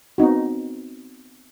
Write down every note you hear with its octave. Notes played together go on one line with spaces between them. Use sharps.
B3 C4 D#4 F#4